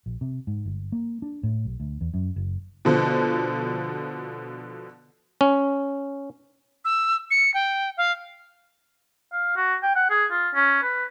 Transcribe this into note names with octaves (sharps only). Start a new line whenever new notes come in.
A#1
C3
G#2
G1
A#3
D4
A2
B1
D2
E2
F#2
F#1
B2 D3 F3
C#4
E6
C#7
G5
F5
F5
F#4
G5
F#5
G#4
F4
C#4
B4